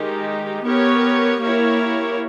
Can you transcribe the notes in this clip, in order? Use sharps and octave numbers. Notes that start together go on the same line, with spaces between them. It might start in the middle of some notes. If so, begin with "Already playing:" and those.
Already playing: D#3 G#3 D#4 G4
B3 G4 A#4 C#5
A#3 E4 G4 A#4 C#5